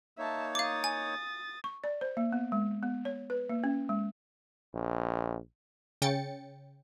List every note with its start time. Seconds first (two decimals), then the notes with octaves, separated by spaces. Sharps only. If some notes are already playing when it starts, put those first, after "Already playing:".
0.18 A#3 D#4 C#5 E5 A5
0.55 F5 D6 D#6 A6
0.84 G#5
1.64 C#6
1.84 D5
2.01 C5
2.17 A#3
2.32 B3
2.52 G#3
2.83 B3
3.05 C#5
3.30 B4
3.49 A#3
3.64 C#4
3.89 G#3
4.74 A#1
6.02 C#3 C#4 G5 A6 C#7